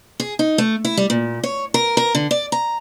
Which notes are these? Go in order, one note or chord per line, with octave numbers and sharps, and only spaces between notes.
G#4
D#4
A3
E4
G3
A#2
C#5
A#4
A#4
D3
D5
A#5